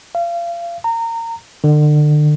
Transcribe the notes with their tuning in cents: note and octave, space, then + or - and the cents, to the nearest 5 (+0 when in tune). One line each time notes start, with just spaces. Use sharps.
F5 -30
A#5 -25
D3 +35